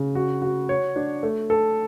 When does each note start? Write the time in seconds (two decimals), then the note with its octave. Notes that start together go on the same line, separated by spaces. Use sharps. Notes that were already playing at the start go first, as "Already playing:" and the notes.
Already playing: C#3
0.15 F#4
0.42 F#4
0.69 C#5
0.96 D4
1.23 A3
1.50 A4